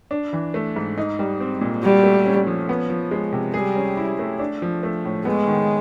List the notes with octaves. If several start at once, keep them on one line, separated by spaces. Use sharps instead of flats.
D4
E3
A3
G#2
D#4
G3
C4
A#2
G3 F#4
A3
C#4
F3
B3
F3
G#3
C3
G3 G#4
C#4
E4
A3
D4
F3
A3
A2
G#3 B3
D#3